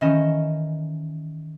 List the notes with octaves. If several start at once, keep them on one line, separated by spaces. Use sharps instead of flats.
D#3 E3 C#4 D#5 E7